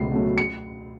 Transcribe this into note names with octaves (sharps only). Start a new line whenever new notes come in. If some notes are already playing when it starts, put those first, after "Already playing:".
Already playing: C#2 B2 F#3 A3 C7
B2 F#3 A3
C#7